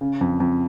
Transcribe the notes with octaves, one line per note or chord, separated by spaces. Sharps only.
C#3
F2
F2